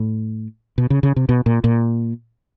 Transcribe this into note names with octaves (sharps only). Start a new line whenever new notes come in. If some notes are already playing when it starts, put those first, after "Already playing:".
Already playing: A2
B2
C#3
C#3
C3
B2
A#2
A#2